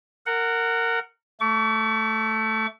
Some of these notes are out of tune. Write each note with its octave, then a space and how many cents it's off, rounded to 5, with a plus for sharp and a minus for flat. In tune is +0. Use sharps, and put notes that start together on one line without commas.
A#4 -20 F#5 +0
A3 +0 C#6 +45